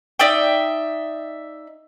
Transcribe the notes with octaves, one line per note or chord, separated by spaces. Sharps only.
D#4 D5 E5 G5